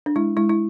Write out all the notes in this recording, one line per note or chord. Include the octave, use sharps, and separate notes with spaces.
D4
G#3 E4
G#3 E4
E4